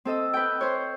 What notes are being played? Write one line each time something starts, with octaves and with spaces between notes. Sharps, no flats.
C4 A4 D#5 E6
B4 G5
C5 C#5